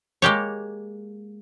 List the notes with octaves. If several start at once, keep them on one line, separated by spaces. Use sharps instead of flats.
G#3 A#3 G4 C#5